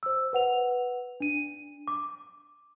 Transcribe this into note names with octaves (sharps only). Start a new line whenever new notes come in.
C5 E6
B4 F#5 F7
D4 D#7
D6